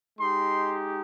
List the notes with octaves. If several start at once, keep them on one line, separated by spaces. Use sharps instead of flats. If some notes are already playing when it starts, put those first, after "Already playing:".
G#3 D#4 G4 C6